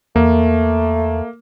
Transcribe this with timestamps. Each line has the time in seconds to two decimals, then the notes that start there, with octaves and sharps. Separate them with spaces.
0.16 E2 A3 A#3